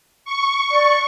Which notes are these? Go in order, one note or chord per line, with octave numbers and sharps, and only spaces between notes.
C#6
D5